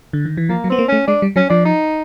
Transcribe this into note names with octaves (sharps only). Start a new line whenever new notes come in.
D3
D#3
E3
F3 A#3
F#3
B3 C4
A#3
A3 C#4
G#3 D4
G3
F#3 C#4
F3 D4
D#4